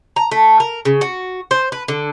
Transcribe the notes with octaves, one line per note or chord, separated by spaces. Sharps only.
A#5
A3
A#4
C#3
F#4
C5
B4
D3